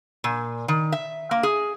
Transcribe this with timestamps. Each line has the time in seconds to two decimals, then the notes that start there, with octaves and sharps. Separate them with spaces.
0.24 A#2
0.68 D#3
0.92 E5
1.31 A#3
1.43 G#4